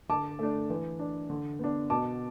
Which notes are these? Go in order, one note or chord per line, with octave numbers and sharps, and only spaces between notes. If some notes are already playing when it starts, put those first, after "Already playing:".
D3 A5 D6
A3 D4
E3
D4
D3
B3 D4
B2 A5 D6